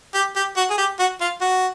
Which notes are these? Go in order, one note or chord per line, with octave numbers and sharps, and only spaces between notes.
G4
G4
F#4
G#4
G4
F#4
F4
F#4